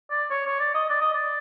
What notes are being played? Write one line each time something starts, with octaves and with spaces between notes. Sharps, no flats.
D5
C#5
C#5
D5
D#5
D5
D#5
D5